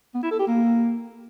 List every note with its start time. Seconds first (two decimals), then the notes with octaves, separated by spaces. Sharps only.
0.14 B3
0.23 E4
0.31 A4
0.39 G4
0.47 A#3